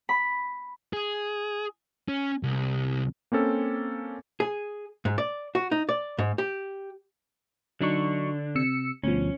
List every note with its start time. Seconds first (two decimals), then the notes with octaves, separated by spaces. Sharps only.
0.09 B5
0.93 G#4
2.09 C#4
2.43 C2
3.32 A#3 C4 C#4 A4
4.40 G#4
5.05 G#2
5.18 D5
5.55 F#4
5.71 D#4
5.89 D5
6.19 G#2
6.38 G4
7.81 D3 F#3 D4 D#4 C#6
8.55 C3 E6 C#7
9.04 D2 B2 F3 C#4